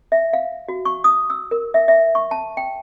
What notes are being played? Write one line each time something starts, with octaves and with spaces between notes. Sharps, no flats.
E5
F5
F#4
C#6
D#6
E6
A#4
E5
E5
C#6
A5
G5